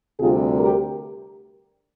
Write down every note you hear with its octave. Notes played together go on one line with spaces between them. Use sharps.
D2 C3 G3 F4 G#4
G4 A#4